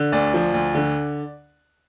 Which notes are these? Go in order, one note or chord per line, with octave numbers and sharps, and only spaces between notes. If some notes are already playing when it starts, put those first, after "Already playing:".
Already playing: D3
D2 D5
F3
D2
D3